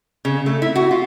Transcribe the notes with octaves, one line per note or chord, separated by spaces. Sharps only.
C#3
A3
E4
F#4
F4